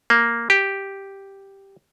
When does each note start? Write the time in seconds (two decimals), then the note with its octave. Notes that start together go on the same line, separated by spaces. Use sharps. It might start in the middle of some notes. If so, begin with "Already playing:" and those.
0.10 A#3
0.50 G4